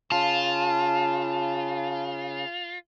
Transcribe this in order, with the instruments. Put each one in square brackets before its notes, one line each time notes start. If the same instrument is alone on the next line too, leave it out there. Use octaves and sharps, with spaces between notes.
[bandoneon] C#3 [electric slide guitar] F4 [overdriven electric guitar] A5